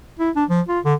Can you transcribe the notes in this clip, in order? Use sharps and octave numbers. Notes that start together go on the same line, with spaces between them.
E4
D4
F3
F4
D3